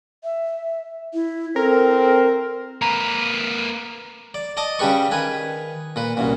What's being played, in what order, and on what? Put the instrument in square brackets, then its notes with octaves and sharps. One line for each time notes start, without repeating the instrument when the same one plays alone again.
[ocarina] E5
E4
[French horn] C4 [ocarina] A4 [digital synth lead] A#4
[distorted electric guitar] A#3 B4 [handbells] A#5
[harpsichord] D5
D5 D#5 A5 D#6
C#3 G3 G4 B4 C#6
D#3 B4 G#5
A#2 B4
C2 F#2 A#2